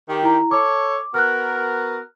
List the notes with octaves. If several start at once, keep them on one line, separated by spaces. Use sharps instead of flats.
D#3 G4
E4 A#5
A4 C#5 D6
B3 F#4 A#4 F6 F#6